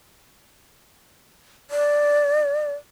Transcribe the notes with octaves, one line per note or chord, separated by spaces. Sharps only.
D5